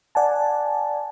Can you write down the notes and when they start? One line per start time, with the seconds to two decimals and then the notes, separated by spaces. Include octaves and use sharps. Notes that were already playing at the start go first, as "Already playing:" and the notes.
0.15 D5 F#5 G#5 A5